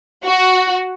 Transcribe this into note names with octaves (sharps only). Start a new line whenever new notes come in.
F#4